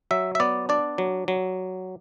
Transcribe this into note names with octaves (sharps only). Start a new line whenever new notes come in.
F#3 E5
E5
B3 D5
D4 D5
F#3
F#3